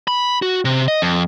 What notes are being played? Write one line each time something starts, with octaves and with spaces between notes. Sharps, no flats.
B5
F#4
C3
D#5
F2